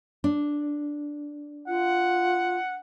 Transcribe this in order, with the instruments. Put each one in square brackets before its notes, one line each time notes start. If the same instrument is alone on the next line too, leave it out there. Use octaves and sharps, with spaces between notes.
[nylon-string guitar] D4
[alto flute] F4 [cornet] F#5